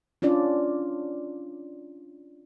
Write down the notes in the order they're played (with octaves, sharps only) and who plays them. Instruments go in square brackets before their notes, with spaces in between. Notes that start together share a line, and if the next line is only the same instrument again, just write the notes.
[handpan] C#4 D4 F4 D5